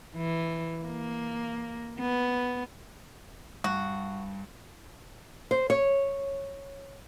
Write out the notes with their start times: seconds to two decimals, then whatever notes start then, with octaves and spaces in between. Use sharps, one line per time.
0.16 E3
0.85 A#3
2.00 B3
3.64 G2 F#4
5.51 C5
5.70 C#5